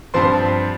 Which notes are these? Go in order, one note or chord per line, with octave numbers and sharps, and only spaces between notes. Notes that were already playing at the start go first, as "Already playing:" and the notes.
G2 F3 C4 C5 C6